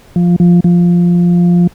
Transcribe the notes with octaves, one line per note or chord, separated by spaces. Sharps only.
F3
F3
F3